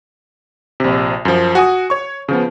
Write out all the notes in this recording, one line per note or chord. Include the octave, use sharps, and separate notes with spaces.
A#1 C3
F#2 F3
F#4 G#5 D#6
C#5 C#6
C#3 F3 B3